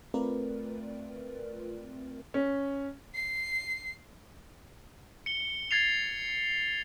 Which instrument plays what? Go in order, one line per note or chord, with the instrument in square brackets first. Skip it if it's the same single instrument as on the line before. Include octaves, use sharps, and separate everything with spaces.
[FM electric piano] A3 C4 F4 A#4 B4 D5
[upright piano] C#4
[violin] C7
[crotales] C#7 G7
G#6 A6 C7 F7